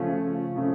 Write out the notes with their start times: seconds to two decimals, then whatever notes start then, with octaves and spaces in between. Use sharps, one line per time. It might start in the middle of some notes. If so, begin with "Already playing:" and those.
Already playing: C#3 F3 A3 C#4 F4
0.56 C#3 F3 A3 C#4